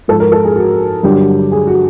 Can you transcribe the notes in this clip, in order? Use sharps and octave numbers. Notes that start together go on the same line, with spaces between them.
G#2 F3 A4
A#4
A4
G#4
F#4
G2 D3 F#3 G4
G#4
F#4